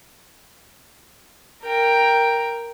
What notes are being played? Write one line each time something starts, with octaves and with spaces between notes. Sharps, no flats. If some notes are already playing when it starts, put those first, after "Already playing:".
A#4 G5